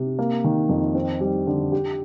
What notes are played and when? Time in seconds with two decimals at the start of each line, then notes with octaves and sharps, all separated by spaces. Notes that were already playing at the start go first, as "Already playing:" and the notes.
Already playing: C3
0.19 A#3
0.44 D#3
0.69 F2
0.95 C4
1.21 G3
1.47 D3
1.72 G4